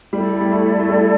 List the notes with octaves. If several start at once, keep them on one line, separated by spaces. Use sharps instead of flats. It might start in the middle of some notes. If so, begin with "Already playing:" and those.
G3 E4 A4 D5
G3
A3
A3
G3